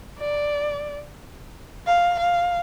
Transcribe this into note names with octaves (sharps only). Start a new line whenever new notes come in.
D5
F5
F5